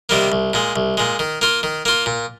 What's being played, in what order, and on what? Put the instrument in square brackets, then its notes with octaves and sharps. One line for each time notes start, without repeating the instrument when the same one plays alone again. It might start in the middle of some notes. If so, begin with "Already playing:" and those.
[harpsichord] C3 D#3 G3 A#3
C2
A#2 G#3
C2
A#2 G#3
D#3
A#3 F4
D#3
A#3 F4
A#2